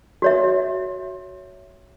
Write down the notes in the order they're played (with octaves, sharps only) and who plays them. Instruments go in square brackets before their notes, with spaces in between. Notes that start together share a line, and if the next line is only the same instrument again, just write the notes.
[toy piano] F#4 C#5 E5